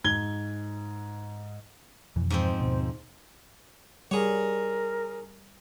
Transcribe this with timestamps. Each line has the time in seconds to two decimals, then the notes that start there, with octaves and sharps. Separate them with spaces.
0.04 G#2 G#6 G7
2.16 F2 B2 E3
2.30 G#2 F3 C4
2.60 D#2 B2
4.11 G3 G#4 A#4 C#5